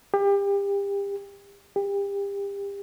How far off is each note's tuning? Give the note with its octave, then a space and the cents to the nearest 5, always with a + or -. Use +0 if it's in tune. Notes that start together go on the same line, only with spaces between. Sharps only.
G4 +30
G4 +30